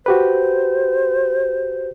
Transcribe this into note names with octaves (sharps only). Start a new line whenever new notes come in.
F#4 G4 B4 C5